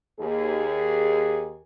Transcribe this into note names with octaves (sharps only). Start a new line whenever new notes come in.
D#2 G#4